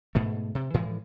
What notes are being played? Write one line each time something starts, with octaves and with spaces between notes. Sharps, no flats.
G#2 B2 A3
C3
A2 E3 F3 G#3